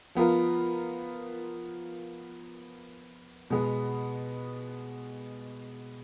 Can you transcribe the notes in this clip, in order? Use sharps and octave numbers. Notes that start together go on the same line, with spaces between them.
F3 B3 F4 A#4
B2 G#3 B3